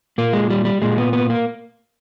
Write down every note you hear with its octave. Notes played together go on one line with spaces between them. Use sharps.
A#2 A#3
G#3
G3
G3
A#2 G#3
B3
B3
A#3